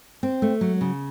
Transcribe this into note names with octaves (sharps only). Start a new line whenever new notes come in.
C4
A3
F#3
C#3